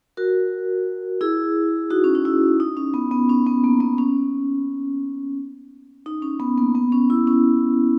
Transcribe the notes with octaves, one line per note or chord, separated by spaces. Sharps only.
F#4 A#4
E4 G#4
D#4 F#4
C#4
D#4
E4
D#4
C#4
B3
B3
C#4
B3
A#3
B3
C#4
D#4
C#4
B3
A#3
B3
C#4
E4
C#4